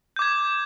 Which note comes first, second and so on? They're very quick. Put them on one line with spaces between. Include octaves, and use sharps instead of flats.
G6 D6 G#6